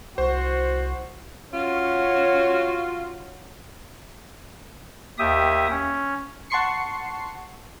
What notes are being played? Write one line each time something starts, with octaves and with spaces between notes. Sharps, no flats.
C2 F#4 C5
C#4 F4 F#4
D#2 G4 E5 D#6
C#4
F#5 A5 C6 C#6 C7 C#7